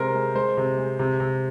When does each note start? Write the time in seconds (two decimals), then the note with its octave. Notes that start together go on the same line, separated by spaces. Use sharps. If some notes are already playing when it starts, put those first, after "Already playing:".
Already playing: C3 G#3 A#4 C5
0.14 G#3
0.35 G#3 C5
0.57 C3
0.78 G#3
0.99 C3
1.20 C3